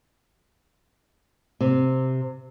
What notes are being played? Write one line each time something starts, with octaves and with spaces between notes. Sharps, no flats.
C3